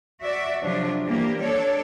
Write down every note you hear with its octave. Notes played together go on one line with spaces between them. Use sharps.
F#4 D5 E5
C3 F3 F#3 D4 F4
E3 G3 A#3 G4
D4 A4 C#5 D5